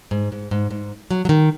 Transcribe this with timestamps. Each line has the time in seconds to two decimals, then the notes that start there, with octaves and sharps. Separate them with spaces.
0.11 G#2
0.32 G#2
0.51 G#2
0.71 G#2
1.11 F#3
1.25 F#3
1.29 D#3